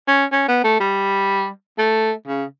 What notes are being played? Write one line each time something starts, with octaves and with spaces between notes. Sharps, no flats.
C#4
C#4
B3
A3
G3
A3
C#3